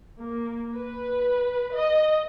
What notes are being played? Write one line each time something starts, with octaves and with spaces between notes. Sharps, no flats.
A#3
B4
D#5